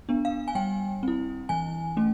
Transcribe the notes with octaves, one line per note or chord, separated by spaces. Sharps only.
B3 D4
F5
G#5
G3 G5
C4 E4
E3 G#5
A3 C#4